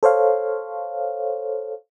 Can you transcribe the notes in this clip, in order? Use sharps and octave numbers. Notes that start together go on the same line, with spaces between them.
A4 C5 C#5 F5